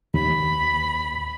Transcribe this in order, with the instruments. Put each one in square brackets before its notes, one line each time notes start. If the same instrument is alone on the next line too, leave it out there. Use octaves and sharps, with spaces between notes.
[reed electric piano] D#2 [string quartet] B5